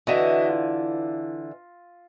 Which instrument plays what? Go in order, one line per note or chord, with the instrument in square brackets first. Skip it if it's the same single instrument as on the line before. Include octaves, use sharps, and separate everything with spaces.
[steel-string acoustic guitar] D3 E3 [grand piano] F#4 D#5 E5
[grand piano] F4